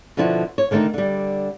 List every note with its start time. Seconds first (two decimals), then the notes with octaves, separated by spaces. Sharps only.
0.17 B2 D3 F3 E4 F#4
0.58 C#5
0.71 D3 D#3 A3 C4 D#4
0.94 D3 G3